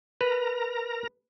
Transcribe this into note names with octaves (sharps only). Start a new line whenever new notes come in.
A#4 B4 A#5